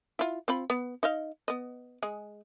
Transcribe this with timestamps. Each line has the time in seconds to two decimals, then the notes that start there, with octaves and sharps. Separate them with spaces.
0.19 E4 F4
0.48 C4 F4 B5
0.70 B3
1.03 D#4 D#5 F5
1.48 B3 D#5
2.02 G#3 G#4